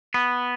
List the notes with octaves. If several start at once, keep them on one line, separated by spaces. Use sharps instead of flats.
B3